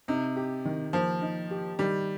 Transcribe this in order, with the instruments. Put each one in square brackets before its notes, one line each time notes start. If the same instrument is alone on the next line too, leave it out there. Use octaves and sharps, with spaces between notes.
[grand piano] C3 [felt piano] D#4
[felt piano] G4
D#3
[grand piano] F3 [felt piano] A#3
[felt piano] D#4
G4
[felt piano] D#3 [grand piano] G3